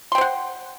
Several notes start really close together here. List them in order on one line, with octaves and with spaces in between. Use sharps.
C6 G5 C5 F#5